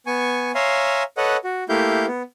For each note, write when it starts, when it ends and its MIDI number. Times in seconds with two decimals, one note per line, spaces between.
0.07 0.52 59
0.07 0.52 80
0.07 0.52 85
0.55 1.03 73
0.55 1.03 76
0.55 1.03 77
0.55 1.03 80
0.55 1.03 82
0.55 1.03 84
1.17 1.37 69
1.17 1.37 71
1.17 1.37 73
1.17 1.37 75
1.17 1.37 78
1.44 1.64 66
1.69 2.06 57
1.69 2.06 58
1.69 2.06 64
1.69 2.06 67
1.69 2.06 77
1.69 2.06 91
2.07 2.22 59